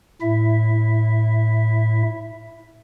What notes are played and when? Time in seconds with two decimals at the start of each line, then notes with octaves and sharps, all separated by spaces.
0.21 A2 E4 E5